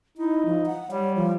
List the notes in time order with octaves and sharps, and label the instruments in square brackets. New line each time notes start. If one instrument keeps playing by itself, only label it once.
[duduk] D#4 [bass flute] E4
[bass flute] F3
F#5
[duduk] G3 [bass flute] C#5
[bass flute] F3